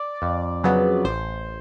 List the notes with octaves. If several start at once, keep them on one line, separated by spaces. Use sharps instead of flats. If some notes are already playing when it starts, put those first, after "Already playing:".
Already playing: D5
F2
C#3 F#3 B3
A1 C5